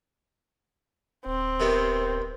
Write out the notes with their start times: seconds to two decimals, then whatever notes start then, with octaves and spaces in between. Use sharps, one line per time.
1.26 D1 C4
1.60 C3 D#3 B3